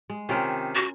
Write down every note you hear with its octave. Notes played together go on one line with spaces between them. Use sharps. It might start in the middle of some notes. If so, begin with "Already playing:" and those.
G#3
C3 D#3 C#4 F4 A#4
F#4